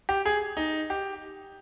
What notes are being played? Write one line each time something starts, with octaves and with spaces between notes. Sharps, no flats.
G4
G#4
D#4
G4